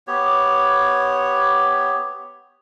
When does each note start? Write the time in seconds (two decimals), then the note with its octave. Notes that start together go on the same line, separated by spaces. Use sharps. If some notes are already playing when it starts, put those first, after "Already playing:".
0.07 B3 G4 C#5